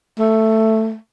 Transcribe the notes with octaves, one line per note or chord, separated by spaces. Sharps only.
A3